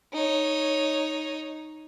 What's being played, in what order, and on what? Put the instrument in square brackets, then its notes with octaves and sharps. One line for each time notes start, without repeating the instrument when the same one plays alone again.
[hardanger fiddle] D#4 C#5